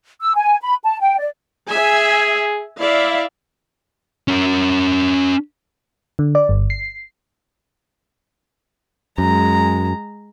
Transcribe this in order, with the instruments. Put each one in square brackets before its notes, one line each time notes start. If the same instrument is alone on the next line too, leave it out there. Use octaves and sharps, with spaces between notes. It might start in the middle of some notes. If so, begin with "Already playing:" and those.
[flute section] E6
G#5
B5
A5
G5
D5
[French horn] G#4 [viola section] E5 G#5
[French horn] E4 [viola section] D5 E5 F5
[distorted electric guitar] C#4 A#4
[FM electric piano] D3
D5
G1
C7
[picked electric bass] F#2 [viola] G#3 A#5